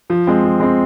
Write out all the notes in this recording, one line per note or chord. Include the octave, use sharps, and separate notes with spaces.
F3
G#3 C4
F3
G#3 C4